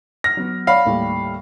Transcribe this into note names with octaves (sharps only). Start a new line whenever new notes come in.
F6 A#6
F#3 B3
C#5 D5 F5 B5
D#2 A2 G3